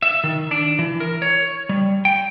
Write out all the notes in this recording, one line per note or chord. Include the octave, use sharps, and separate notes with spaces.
E5
D#3
D4
E3
A#4
C#5
G3
G5